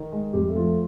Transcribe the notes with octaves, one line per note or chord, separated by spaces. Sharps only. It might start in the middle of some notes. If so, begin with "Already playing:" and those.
Already playing: D#3 D#4
G#3
F2 G3 G4
A3 A4
F3
A3 A4